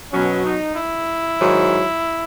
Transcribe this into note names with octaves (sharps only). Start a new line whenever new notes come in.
B2 F#3 C#4
D#4
E4
G#2 D#3 F#3